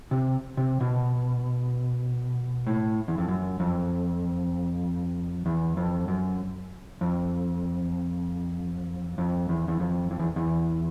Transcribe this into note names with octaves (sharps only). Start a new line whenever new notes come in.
C3
C3
B2
A2
E2
F2
F#2
F2
E2
F2
F#2
F2
F2
E2
E2
F2
F2
E2
E2